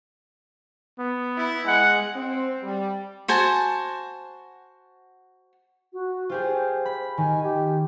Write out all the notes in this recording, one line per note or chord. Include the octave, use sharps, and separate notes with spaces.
B3
E4
G#3 F#5
C4
G3
F#4 C5 G#5 A5
F#4
F4 G4 G#4 C5
B5
D#3 G#5
G4